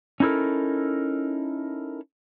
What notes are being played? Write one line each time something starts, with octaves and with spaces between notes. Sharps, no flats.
C#4 D#4 E4 A4 A#4